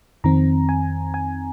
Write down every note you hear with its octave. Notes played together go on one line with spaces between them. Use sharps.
F2 D#3 C4 A#5
G#5
G#5